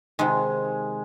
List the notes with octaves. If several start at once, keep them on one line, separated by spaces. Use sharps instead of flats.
C3 D#3 G#3